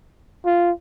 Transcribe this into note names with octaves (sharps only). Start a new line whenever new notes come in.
F4